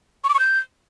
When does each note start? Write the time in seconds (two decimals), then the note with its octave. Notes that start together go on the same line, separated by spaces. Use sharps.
0.24 C#6
0.29 D6
0.34 C#6
0.39 G6